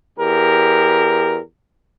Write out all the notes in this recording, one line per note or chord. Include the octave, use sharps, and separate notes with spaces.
E2 G4 A#4